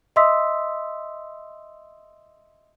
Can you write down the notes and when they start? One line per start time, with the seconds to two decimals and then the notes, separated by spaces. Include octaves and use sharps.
0.16 D#5 E5 C6 D#6 E6 B6